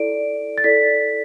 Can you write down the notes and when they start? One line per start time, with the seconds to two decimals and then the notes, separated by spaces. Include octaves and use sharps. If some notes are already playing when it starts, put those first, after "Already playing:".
Already playing: E4 A4 D5 D7
0.58 A6
0.64 E4 A4 D5 B6